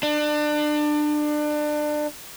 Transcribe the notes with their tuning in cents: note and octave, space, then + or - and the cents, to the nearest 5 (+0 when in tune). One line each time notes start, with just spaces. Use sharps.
D4 +30